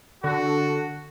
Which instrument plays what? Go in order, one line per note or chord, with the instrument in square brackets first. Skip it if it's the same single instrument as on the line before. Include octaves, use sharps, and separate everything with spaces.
[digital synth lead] D3 [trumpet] F#4 [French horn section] A4